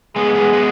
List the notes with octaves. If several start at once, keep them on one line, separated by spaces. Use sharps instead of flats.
G#3 B3 G#4
G#3 B3
G#3 B3